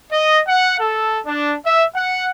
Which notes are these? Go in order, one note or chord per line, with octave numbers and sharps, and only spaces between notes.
D#5
F#5
A4
D4
E5
F#5